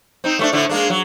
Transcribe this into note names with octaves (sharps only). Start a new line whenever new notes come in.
C4 D#4
A3 C4 D4
A2 D3 A3
G#3 A#3 D4
F#3